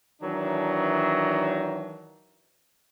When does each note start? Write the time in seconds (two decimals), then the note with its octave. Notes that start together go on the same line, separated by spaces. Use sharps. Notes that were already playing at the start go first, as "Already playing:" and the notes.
0.22 D#3 E3 F#3 D4